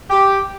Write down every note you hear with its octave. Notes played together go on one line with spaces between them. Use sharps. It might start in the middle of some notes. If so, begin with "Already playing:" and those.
G4